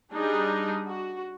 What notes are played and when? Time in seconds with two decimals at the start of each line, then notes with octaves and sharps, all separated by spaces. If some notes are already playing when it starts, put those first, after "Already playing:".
0.13 G3 D4 D#4 G#4
0.87 F#4